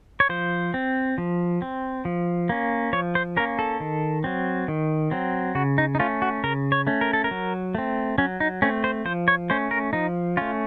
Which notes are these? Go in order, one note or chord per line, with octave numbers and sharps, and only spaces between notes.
C#5
F3 C5
C4
F3
C4
F3
A#3 C#4
F3 C#5
C5
A#3 C#4 A#4
A4
D#3
F#3 C4
D#3
F#3 C4
C#3 F#4
D#4
D#4
A3 C#4 F4
F#4
C#3 A#4
C#5
A3 C#4
A#4
A4
A#4
F#3
A3 C4
F#3 C#4
D#4
A3 C4 C#4
C5
F3 C5
C#5
A3 C#4 C5
A#4
F3 D#4
A3 C#4 F4